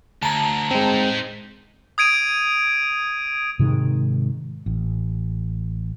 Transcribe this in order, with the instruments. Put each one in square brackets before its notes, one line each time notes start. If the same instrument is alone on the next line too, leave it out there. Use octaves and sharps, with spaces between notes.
[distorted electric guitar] D2 [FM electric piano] A5 A#5
[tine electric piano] G#3 C4 [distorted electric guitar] D#4 C5
[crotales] D#6 G#6 D7 D#7
[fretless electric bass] G#2 C3 D#3 G#3
A1